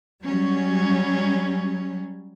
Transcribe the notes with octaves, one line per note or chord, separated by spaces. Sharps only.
F#3 G3 C#4